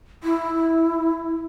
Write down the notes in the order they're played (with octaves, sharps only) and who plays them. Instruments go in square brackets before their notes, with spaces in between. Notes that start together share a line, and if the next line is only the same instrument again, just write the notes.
[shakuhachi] E4